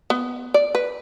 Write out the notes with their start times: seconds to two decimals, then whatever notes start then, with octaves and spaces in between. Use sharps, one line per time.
0.10 B3
0.54 D5
0.75 B4